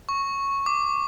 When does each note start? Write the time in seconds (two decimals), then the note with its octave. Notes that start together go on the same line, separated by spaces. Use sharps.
0.09 C#6
0.66 D6